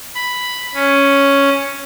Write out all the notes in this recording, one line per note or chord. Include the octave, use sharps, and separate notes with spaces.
B5
C#4